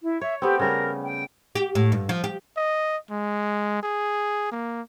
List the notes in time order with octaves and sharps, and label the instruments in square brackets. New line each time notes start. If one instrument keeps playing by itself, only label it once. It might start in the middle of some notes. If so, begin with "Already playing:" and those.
[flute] E4
[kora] C#5 [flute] E5
[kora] A3 B3 C4 [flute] G4
[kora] C#3 G3 [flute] A#4
[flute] G5
[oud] G4
A2
G2
F3
G4
[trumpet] D#5
G#3
G#4
A#3